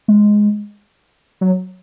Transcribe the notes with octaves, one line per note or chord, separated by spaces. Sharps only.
G#3
F#3